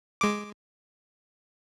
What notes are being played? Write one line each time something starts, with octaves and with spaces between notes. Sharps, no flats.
G#3 D6